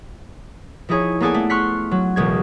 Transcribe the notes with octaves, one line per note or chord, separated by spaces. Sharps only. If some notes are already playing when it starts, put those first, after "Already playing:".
F3 D#4 E4 G#4 C#5
A#3 B3 G#4 A4 D5 G#5
A3
C6 C#6 F6 F#6 B6 C#7
F#3
E1 C#2 G#6